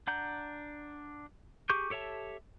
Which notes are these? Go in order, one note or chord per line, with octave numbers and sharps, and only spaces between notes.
D4 F#5 A#5 G6
G4 G#4 C#6 D6 G6
G4 A4 C#5 E5 A5